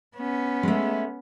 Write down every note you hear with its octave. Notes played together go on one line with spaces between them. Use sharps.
B3 C#4
G#3 A3